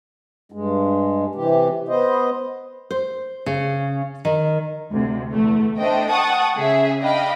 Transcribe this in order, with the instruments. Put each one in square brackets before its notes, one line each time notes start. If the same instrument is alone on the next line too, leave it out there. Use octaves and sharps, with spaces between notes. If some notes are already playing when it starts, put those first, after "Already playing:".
[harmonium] G2 G#3
C3 E3 G4
B3 C5 D#5
[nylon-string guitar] C5
C#3
D#3
[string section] D2 C3
E2 A3
A3 D4 C5 D#5 G5
F#5 G5 A5 C#6 D#6
C#3 G#4 E5
D4 D#5 F5 G5 B5